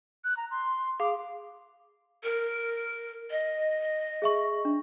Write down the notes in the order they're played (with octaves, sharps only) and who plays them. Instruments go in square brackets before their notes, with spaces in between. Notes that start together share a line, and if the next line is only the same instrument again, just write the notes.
[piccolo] F#6
A#5
C6
[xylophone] G#4 F5 [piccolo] D6
[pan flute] A#4
D#5
[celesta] G#4 E5 C#6
D4